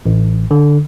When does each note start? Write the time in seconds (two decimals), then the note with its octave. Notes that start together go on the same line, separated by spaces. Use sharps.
0.06 A1
0.51 D3